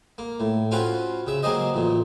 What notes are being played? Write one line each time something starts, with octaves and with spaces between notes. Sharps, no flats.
A#3
A2
C4 C#4 F4 F#4 B4 F5
C#3 E5
F#3 A#3 C4 G#4 C5 D#5
A1 A#2